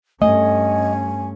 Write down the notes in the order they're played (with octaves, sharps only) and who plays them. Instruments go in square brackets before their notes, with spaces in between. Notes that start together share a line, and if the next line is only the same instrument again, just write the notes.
[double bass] G2 C#4 [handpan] A3 [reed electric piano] D#5 [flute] G#5